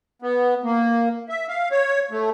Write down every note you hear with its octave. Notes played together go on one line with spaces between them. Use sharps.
B3
A#3
E5
F5
C#5
A3